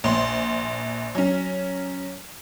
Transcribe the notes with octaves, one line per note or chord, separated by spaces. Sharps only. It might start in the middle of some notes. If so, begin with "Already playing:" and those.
A#1 C6
F#3 C#4